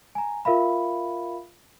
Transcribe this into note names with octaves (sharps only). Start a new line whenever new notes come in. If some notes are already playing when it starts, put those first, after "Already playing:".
G#5 A#5
F4 A#4 E5 F5 B5